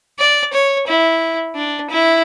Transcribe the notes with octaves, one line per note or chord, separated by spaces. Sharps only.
D5
C#5
E4
D4
E4